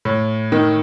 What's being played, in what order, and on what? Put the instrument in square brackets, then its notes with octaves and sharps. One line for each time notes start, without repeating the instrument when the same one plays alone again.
[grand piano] A2
D#3